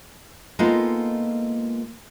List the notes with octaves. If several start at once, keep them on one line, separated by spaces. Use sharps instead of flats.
G#3 A#3 B3 D#4 F4 A4